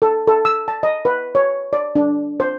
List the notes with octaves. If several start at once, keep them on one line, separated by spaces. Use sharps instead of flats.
A4
A4
E6
A5
D#5
B4
C#5
D5
D4
C5